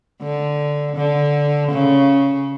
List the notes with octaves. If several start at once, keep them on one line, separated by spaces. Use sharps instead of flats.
D3
D3
C#3